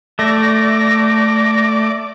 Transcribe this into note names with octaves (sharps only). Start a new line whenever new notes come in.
A3 D5 A#6